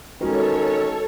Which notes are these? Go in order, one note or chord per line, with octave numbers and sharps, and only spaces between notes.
D#3 G#3 C#4 F#4 A4 B4 C#5